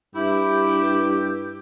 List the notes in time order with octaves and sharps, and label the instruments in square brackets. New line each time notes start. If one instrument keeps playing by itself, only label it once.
[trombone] G2 [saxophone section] E4 [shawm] G4